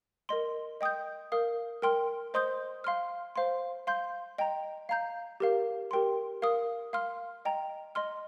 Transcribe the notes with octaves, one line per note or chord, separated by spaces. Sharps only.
A#4 D#5 C6
D#5 G5 D#6 G6
A#4 F5 D#6
A#4 G5 C6 F6
C5 D#5 C6 D#6 G6
F5 C6 F6
C5 F5 C6
F5 C6 G6
D#5 G5 A#5
F5 A#5 G6
G4 A#4 F5
G4 A#4 G5 C6
A#4 F5 D#6
F5 C6 F6
D#5 G5 A#5
D#5 C6 F6